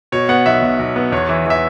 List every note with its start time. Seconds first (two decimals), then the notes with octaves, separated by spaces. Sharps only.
0.12 B2 C#5
0.29 B3 F#5
0.46 B1 E5
0.62 B1
0.79 B1
0.96 B3
1.12 E2 C#5
1.29 E3
1.46 E3 E5